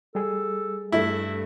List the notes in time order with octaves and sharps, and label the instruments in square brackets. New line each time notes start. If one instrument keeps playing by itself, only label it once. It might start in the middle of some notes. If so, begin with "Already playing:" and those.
[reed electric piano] G3 G#4 [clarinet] A4
[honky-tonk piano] G2 A3 [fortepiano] E4 [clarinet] E5